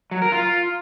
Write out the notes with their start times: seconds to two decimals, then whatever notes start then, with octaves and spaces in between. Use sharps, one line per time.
0.11 F#3
0.22 A#4
0.32 F4